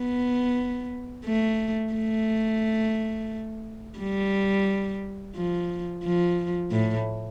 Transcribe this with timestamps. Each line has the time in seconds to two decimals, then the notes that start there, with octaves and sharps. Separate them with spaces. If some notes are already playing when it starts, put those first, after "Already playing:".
Already playing: B3
1.25 A3
1.94 A3
3.99 G3
5.36 F3
6.04 F3
6.71 A2